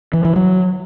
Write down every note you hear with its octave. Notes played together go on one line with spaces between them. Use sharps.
E3
E3
F#3